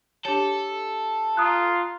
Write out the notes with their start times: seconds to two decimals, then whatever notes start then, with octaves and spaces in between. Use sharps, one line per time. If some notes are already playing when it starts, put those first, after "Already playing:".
0.25 D4 G4 A4 C#5
1.37 F4 A#5 D#6 F#6